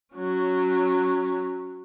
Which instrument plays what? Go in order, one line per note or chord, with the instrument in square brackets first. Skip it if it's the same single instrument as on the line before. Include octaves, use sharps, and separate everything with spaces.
[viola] F#3 C#4